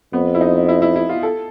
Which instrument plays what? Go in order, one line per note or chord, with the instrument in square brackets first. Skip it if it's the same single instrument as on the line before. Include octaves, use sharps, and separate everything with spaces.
[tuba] F2 [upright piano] B3
[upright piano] E4
D#4
E4
E4
E4
F4
A4